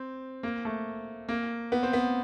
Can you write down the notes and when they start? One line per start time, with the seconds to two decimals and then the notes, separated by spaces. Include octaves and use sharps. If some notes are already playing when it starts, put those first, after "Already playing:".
Already playing: C4
0.43 A#3
0.65 A3
1.29 A#3
1.72 B3
1.83 C4
1.93 B3